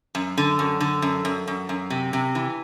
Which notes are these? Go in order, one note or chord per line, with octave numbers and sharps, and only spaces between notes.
F#2
D3
F#2
D3
F#2
F#2
F#2
F#2
C3
C3
E3